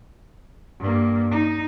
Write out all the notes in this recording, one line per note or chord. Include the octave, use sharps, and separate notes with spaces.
G2 A#3
D#4